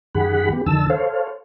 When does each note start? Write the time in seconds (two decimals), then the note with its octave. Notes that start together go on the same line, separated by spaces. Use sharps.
0.15 F#2 D#3 G4 G#4 F#5 B5
0.53 B3 G4
0.66 F2 D3 D#3 A5 E6
0.90 A4 C5 C#5 F5